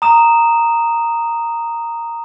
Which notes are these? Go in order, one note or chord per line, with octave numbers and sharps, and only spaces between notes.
A#5 D#6 E7